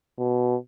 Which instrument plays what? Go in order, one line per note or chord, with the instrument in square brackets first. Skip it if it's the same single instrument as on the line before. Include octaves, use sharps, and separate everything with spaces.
[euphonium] B2